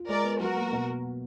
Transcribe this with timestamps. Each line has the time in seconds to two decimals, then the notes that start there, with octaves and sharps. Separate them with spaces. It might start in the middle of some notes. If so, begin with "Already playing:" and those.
Already playing: F4
0.09 G#3 A#4 D5
0.24 B3
0.40 F#3 F#4 A#4
0.57 A#3
0.73 B2